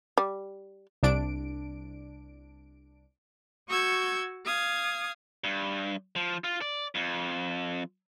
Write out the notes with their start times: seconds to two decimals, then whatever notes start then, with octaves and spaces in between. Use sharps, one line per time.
0.18 G3
1.03 C2 D4 D7
3.68 F#4 C#6 E6 G6 G#6
4.45 F5 D#6 G#6
5.44 G2
6.16 F3
6.44 F4
6.61 D5
6.95 F2